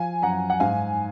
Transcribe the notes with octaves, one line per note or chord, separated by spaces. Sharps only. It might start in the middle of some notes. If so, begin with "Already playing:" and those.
Already playing: F3 F5 G#5
F#2 F#5 A#5
F#5
G#2 F5 G#5